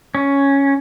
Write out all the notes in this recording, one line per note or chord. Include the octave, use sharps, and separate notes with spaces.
C#4